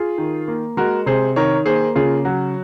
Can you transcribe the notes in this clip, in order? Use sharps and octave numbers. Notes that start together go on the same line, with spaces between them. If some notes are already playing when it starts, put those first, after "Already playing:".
Already playing: F4 G#4
D#3
A#3
G#3 F#4 A#4
C3 G#4 C5
D#3 A#4 C#5
A#3 G#4 C5
C#3 F4 G#4
F#3 F#4